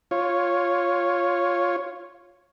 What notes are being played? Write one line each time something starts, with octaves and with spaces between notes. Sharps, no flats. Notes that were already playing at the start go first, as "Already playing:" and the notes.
F4 C#5